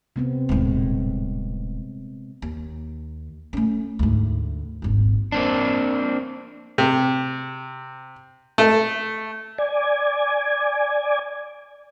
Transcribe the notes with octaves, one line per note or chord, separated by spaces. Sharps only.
C3 B3 C4
D#1 A2 G#3
D#2
A3 C#4
D2 G#2
D#1 G#1
A#3 C4 D4
C3
A3
D5 G#5